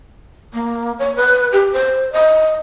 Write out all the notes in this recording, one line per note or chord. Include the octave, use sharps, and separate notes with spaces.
A#3
C#5
B4
G4
C5
D#5